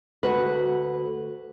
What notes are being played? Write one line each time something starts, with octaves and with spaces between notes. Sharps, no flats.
D2 F#4 B4